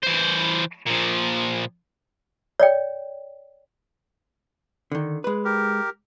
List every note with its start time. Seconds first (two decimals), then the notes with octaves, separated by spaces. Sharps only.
0.03 E3 C5
0.87 A#2 F3
2.60 C#5 D5 G5
4.92 D3 D#3
5.24 G#3 B4
5.45 G4 A#4